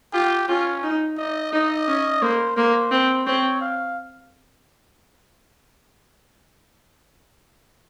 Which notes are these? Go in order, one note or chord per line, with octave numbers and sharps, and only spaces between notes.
F4 G4
C#4 F4
D#4
D#4 D#5
D#4 D#5
C#4
A#3 C5
A#3 C5
C4
C4 C#5
F5